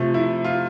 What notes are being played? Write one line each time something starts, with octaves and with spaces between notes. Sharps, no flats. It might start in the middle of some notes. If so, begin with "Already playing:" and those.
Already playing: C3 F3 A3
E4
F4